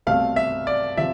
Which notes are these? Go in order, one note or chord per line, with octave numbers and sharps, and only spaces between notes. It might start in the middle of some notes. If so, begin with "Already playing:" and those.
C2 B2 A3 C4 F5
E5
D5
C3 F3 E5